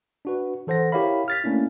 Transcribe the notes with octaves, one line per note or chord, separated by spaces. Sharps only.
D4 F#4 B4
E3 A4 C5 F#5 A#6
E4 G4 A#4 C#5 F5 B5
F6 A6 B6
A3 A#3 C#4 D4 E4